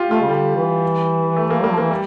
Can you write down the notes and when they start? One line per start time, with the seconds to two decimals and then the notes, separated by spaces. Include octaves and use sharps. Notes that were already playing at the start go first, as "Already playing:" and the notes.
Already playing: F4 G4
0.10 A3 F4
0.22 C#3
0.28 D3 G3
0.56 E3
1.36 A3
1.50 A#3
1.62 G3 A#3
1.71 F3
1.78 E3 A#3
1.91 G3